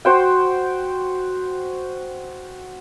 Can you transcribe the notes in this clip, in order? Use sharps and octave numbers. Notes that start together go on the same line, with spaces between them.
F#4 C5 G5